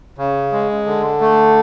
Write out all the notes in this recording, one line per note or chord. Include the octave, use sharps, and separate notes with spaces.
C#3
G#3
D3
A3